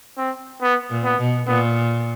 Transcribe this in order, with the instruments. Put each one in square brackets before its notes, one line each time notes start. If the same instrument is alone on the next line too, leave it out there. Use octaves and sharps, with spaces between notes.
[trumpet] C4
B3
[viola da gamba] A#2
[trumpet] B3
[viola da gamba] B2
[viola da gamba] A#2 [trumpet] B3